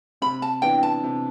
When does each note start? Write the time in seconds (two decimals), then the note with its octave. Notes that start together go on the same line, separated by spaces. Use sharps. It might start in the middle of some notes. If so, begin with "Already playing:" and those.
0.22 C3 B5
0.42 A5
0.62 E3 B3 D4 G5
0.83 A5
1.04 C3